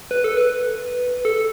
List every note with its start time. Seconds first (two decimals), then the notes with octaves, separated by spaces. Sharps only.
0.11 B4
0.24 A4
0.37 B4
1.25 A4